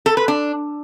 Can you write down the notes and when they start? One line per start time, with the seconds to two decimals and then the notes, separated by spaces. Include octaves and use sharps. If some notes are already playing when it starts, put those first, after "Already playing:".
0.06 A4
0.17 B4
0.28 D4